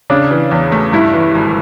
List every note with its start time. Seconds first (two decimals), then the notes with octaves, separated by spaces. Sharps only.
0.10 C#3 D4
0.31 E3
0.51 E2
0.72 A3
0.93 G2 E4
1.14 E3
1.35 G#1